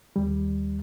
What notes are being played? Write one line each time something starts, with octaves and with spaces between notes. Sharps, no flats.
D#2 G3